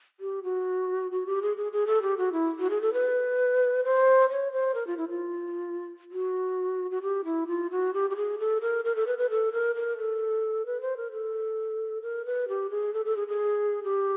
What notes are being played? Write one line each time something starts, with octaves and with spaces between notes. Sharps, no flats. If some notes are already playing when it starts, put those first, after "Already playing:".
G4
F#4
F#4
G4
G#4
G#4
G#4
A4
G4
F#4
E4
F#4
G#4
A4
B4
C5
C#5
C5
A#4
F4
E4
F4
F#4
F#4
G4
E4
F4
F#4
G4
G4
G#4
A4
A#4
A#4
A4
B4
B4
A4
A#4
A#4
A4
B4
C5
A#4
A4
A#4
B4
G4
G#4
A4
A4
G#4
G#4
G4